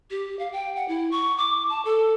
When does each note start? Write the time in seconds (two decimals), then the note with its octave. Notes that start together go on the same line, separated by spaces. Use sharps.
0.11 G4
0.39 F5
0.53 G5
0.76 F#5
0.88 E4
1.11 C#6
1.38 D6
1.69 A5
1.85 A4